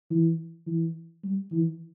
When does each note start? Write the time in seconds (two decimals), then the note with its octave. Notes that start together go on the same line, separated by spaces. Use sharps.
0.11 E3
0.67 E3
1.24 G3
1.52 E3